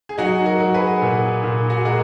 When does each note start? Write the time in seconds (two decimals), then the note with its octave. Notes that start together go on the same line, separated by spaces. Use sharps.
0.09 G#4
0.18 F#3 D#4 F#4
0.46 F#4 A#4
0.60 F#3
0.74 G#4 B4
1.02 A#2
1.43 A#2
1.70 F#4
1.78 G#4
1.85 G#3 F#4 A#4